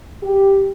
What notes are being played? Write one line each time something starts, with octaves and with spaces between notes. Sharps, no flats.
G4